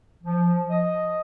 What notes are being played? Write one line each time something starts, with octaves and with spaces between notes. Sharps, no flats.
F3
D#5